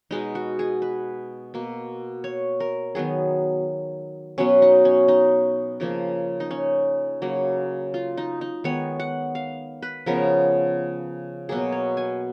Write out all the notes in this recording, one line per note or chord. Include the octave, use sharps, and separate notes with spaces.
B2 G#3 B3 D#4
F#4
G#4
B4
B2 A#3
C#5
A#4
D#3 F#3 B3 G#4
B2 F#3 B3 C#4
D#4
C#4
D#4
C#3 F3 A#3
D#4
C#4
C#3 F#3 A#3
F4
D#4
D#4
D#3 G#3 B3 C#5
F#5
F5
B4
C#3 F3 B3 A#4
B2 F#3 A#3 G#4
C#5
G#5